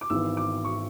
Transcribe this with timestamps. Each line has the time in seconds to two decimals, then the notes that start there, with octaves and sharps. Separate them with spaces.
0.01 D6
0.10 G#1 G#2 E3 B3 E6
0.37 D6
0.65 C#6